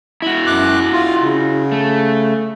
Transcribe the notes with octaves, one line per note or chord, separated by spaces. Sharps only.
E4 F#4
F#2 D6 F#6
F4
C#3
A3